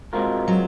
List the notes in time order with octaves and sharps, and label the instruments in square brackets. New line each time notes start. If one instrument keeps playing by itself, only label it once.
[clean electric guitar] B2 G#3 C4 F4 A#4
[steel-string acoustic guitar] F#3